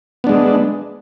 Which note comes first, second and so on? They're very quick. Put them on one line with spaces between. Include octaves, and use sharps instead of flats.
B3 D4 G#3